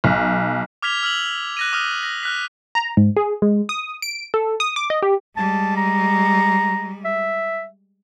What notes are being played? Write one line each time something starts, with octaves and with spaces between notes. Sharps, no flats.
B1
D6 F6 G#6 B6 F7 G7
E6 F6 F7 F#7
F#6 A#6 D#7
D6 D#6 F6
A#6
F6 F#6 B6
A#5
G#2
G#4
G#3
D#6
D7
A4
D#6
D6
D#5
G4
G3 G#3 A5
A#5
E5